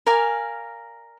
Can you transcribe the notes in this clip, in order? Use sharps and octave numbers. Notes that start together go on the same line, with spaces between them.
A#4 D5 F5 G#5